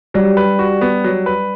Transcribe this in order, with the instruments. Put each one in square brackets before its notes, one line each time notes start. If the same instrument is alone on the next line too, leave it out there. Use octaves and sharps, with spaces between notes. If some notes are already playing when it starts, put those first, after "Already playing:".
[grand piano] F#3 [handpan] G3
[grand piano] B4
F#4
B3
F#3
B4